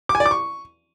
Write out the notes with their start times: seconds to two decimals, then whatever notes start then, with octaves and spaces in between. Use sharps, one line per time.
0.09 D6
0.15 G#5
0.20 D5
0.26 D6
0.31 C#6